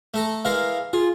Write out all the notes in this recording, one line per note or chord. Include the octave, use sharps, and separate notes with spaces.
A3 A4 A#5
E3 G#3 A#4 F5
F4 G#4